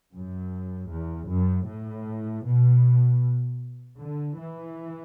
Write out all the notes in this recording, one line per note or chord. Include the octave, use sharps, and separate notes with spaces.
F#2
E2
F#2
A2
B2
D3
E3